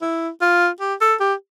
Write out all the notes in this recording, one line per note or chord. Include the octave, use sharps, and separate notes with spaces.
E4
F4
G4
A4
G4